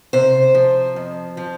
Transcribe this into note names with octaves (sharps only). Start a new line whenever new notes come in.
C3 C5
F3
F2
F3